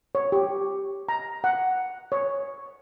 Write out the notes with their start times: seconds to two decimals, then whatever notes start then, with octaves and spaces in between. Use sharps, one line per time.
0.15 C#5
0.32 G4
1.09 A#5
1.44 F#5
2.12 C#5